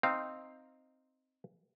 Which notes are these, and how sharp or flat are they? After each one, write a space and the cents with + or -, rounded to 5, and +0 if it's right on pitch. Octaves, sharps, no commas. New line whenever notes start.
C4 +0 D#4 +0 F5 +0